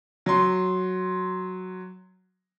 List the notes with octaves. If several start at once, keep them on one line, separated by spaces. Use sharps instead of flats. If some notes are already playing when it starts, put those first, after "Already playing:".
F#3 C6